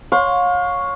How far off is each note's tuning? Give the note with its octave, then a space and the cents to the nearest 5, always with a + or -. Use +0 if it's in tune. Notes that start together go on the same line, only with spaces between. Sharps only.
C#5 +0 F5 +35 C6 +0